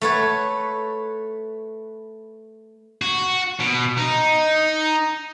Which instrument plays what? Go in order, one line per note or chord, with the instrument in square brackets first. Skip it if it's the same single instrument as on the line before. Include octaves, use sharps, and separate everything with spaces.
[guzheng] A3 B4 C#5
[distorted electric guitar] F#4
B2
D#4